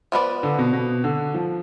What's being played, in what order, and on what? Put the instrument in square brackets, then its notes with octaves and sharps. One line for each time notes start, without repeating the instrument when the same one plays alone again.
[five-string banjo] F3 B3 E4 B4 D5
[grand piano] D3
B2
B2
D3
F3